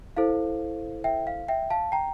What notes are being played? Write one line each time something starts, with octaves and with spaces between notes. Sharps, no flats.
E4 A4 C5 F5
E5 G5
F5
E5 G5
F5 A5
G5 A#5